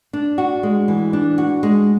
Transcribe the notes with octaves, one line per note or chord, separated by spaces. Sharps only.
D4
F#4
G#3
E3
D4
F#4
G#3